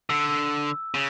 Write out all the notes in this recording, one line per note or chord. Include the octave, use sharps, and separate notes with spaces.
D3 E6
C#3